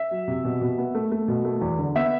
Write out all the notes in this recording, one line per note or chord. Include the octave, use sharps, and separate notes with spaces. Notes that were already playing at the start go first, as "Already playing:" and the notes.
Already playing: E5
F#3
C3
B2
B2
B3
A3
A3
B2
A3
E2
D3
B3 E5